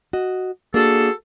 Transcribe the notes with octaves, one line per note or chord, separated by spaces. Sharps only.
F#4 D#5
A#3 D4 F#4 G#4 A4